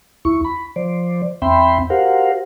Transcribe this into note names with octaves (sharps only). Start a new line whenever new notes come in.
D#2 E4 C#6
B5
F3 C5 D5
E2 C4 E5 G5 B5 C6
F#4 G4 A#4 C5 F5 F#5